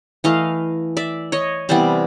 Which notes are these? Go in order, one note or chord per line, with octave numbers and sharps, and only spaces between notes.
E3 A3 D#5 F5
D5 E5
C#5 D#5
C3 E3 G3 B3 C5 D5